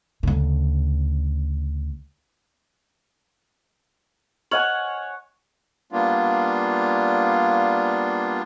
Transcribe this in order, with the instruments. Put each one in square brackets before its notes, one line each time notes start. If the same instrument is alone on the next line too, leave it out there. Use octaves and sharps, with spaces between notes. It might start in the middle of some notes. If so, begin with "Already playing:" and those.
[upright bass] D2 C#3
[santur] C#5 F#5 G#5 [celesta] D#5 F6 F#7
[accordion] G3 A#3 B3 D4 F4